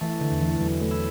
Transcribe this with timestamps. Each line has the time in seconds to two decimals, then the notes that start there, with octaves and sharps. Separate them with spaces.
0.01 E3 A3
0.21 D3
0.31 E2
0.42 E3
0.61 E2 F#3
0.82 A3
0.91 E4